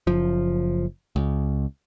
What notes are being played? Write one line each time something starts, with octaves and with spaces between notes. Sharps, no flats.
F#1 F3
C#2